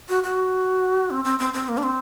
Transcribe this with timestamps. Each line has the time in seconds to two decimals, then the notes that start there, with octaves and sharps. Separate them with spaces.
0.09 F#4
0.23 F#4
1.11 C4
1.25 C4
1.39 C4
1.53 C4
1.69 A#3
1.78 D4
1.83 C4